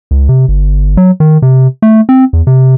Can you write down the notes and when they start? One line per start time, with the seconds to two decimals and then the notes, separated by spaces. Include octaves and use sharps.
0.11 C#2
0.29 C3
0.48 G1
0.97 F#3
1.20 D#3
1.42 C3
1.82 A3
2.09 C4
2.33 E2
2.47 C3